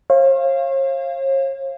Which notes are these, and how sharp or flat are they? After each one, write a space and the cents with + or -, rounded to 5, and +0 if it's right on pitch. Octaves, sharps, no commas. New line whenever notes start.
C#5 -45 F5 -15